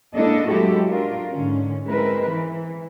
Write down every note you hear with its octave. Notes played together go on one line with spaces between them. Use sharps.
G#3 A#3 D4 E4 A4 D#5
F#3 G#3 E4 F#4 G4 A4
D4 F4 A#4
G#2 D3 C#4
G#3 C4 E4 A#4 B4
E3